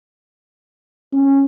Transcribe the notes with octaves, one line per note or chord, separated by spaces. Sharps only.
C#4